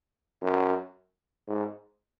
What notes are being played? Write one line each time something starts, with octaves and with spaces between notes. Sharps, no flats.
F#2
G#2